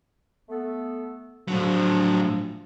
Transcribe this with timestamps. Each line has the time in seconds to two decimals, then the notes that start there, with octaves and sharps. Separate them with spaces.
0.49 A3 B3 A4
1.48 A2 F3 F#3 D4